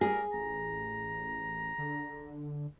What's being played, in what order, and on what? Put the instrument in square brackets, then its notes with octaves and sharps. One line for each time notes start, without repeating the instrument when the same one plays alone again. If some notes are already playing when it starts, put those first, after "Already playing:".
[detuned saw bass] G3 [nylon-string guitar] G#4 [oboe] A#4
[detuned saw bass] A1 [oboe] A#5
[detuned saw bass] D3